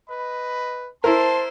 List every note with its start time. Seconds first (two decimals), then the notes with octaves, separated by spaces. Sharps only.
0.10 B4 D#5 B5
1.04 E4 A#4 C5 A5 C6